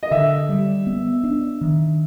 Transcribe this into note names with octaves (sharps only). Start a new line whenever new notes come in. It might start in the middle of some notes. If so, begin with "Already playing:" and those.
D#5
D3 E5
G3
B3
D4
D#3